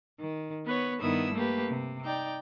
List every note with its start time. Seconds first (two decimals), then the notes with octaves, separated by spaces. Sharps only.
0.20 D#3
0.65 B3 B4 C#5
0.99 G2 D#3 B3 E4 D#6 E6
1.33 A3 A#3 G4 B4
1.68 C3
2.04 D#4 D5 G5